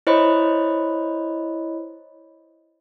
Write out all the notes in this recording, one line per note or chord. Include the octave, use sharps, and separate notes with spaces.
E4 C5 C#5 D#5 B5